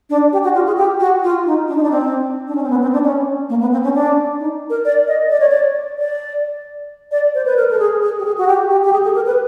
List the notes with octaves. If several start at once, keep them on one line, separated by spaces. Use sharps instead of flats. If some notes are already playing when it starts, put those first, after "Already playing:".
D4
G4
F#4
F4
G#4
G4
F#4
F4
D#4
D4
D#4
D4
C4
D4
C#4
C4
B3
C4
D4
C#4
A#3
B3
C4
C#4
D4
D#4
A#4
D5
D#5
D5
C#5
D5
D5
D5
C5
B4
A#4
A4
G#4
G#4
G4
G#4
F#4
G4
G4
G4
G#4
A4
A#4
B4